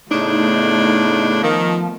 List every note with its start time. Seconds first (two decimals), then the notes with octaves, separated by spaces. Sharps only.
0.11 A2 C#3 A3 B3 D4 D#4
1.43 D#3 F3